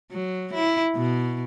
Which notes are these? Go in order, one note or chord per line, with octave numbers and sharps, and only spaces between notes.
F#3
E4
B2